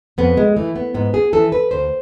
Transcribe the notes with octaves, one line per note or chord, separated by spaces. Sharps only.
F2 B3
G#3
E3 A3
B3
G#2 B3
G#4
E3 A4
B4
D2 C5